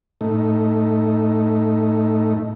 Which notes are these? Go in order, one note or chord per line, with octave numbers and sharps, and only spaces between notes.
A2 A3 D#4